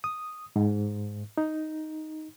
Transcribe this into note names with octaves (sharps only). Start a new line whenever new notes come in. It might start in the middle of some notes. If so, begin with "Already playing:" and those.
D#6
G#2
D#4